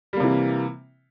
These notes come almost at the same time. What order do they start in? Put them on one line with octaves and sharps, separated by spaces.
G3 A#3 C3 E3